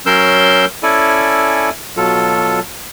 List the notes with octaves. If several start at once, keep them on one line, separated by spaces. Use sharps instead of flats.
F#3 C#4 A#4 C6 E6 G6
C#4 E4 A4 D5 G#5
B2 F#3 F4 A4